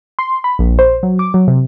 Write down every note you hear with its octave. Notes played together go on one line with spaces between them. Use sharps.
C6
B5
A#1
C5
F#3
D6
F#3
C3